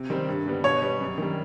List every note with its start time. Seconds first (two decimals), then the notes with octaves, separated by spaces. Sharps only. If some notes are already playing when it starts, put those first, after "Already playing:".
Already playing: C3
0.10 D#3 G3 C4
0.28 G2
0.46 D3 G3 B3
0.64 B2 C#5
0.82 G3 B3
1.01 F#2
1.18 D#3 G3